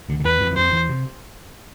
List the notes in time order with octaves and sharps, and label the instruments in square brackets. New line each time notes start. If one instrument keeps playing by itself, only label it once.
[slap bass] D2 D3
D3
[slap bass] E2 E3 [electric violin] B4
[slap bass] F2 F3
E3
[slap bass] F2 F3 [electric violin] C5
[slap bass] E2 E3
C3